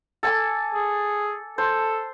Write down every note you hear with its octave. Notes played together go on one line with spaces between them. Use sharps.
A4 G#5 D6
G#4
A4 C5